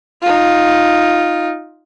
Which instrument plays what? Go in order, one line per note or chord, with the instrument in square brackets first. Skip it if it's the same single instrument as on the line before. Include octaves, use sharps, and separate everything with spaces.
[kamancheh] D#4 F4